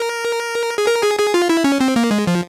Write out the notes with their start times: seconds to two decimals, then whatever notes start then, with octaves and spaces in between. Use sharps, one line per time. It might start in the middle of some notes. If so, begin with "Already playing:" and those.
Already playing: A#4
0.78 G#4
0.88 A#4
1.03 G#4
1.19 G#4
1.34 F4
1.49 E4
1.64 C#4
1.80 C4
1.96 A#3
2.11 G#3
2.27 F3